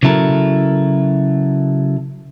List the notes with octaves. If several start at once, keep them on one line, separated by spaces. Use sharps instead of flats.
C#3 F#3 E4 A4 A#4